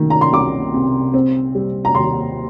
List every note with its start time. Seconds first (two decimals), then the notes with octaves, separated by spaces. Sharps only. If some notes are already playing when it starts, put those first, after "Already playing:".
Already playing: D#3 A3
0.10 A#5
0.21 C6
0.32 C2 D6
0.74 C3
1.14 C4
1.55 G3
1.85 A#5
1.95 D#2 C6